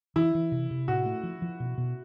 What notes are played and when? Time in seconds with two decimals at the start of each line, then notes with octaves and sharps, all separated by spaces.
0.16 E3 E4
0.35 E3
0.52 C3
0.71 C3
0.88 A2 F#4
1.06 A3
1.23 F3
1.42 F3
1.60 B2
1.78 B2